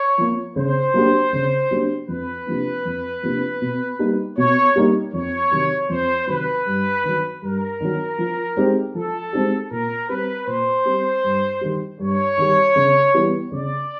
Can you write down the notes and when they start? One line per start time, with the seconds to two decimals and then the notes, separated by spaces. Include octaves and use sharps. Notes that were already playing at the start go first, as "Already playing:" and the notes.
Already playing: C#5
0.18 F3 A#3
0.56 C#3 C5
0.94 F#3 A#3 D4 G4
1.33 C#3
1.71 F#3 A#3 D4 G4
2.08 F2 B4
2.46 C3 F3 A#3 D4
2.85 F2
3.23 C3 F3 A#3 D4
3.62 B2
3.99 G3 A#3 D#4
4.38 B2 C#5
4.76 G3 A#3 D#4
5.13 F2 C#5
5.51 C3 D#3 F#3
5.89 F2 C5
6.27 C3 D#3 F#3 B4
6.66 G2
7.04 D#3 F#3
7.42 G2 A#4
7.81 D#3 F#3
8.18 F3
8.57 G#3 C4 D#4 G4
8.95 F3 A4
9.33 G#3 C4 D#4 G4
9.71 A#2 A#4
10.09 G3 C4 B4
10.46 A#2 C5
10.85 G3 C4
11.24 G2
11.61 D#3 G3
11.99 G2 C#5
12.38 D#3 G3
12.76 C#3
13.14 E3 G3 B3 E4
13.51 C#3 D5